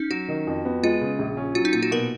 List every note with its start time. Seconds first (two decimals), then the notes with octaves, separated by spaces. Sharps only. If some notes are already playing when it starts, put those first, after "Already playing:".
Already playing: C#4 D#4
0.11 F#3 F#4
0.28 D#3
0.47 F2
0.65 B3
0.83 G#3 F4
1.01 C#3
1.19 A#1
1.37 C#4
1.55 F#3 F4
1.65 D#4
1.73 A#2 F4
1.83 F#4
1.91 B2 A#4